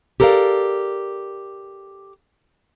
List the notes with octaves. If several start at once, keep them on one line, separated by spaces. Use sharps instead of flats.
G4 A4 A#4 C5 D5 F5